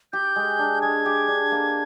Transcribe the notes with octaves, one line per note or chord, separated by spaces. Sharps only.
G4 G6
G#3
D4
G#3 G#6
G4
D4
A#3